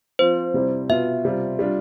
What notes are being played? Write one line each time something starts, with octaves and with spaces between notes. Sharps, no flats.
F3 C4 F4 C5
C3 G3 C4 E4
B2 B3 F4 E5
C3 G3 C4 F4
G3 D4 F4